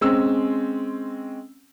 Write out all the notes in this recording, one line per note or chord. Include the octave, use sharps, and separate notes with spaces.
G#3 C4 C#4 E6